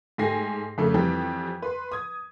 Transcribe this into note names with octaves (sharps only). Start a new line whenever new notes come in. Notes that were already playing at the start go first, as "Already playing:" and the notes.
G#2 A3 G4 G#5 A#6 C7
F2 C#3 A3
F2 E3 G3 C4 G5
B4 C6
D#6 G#6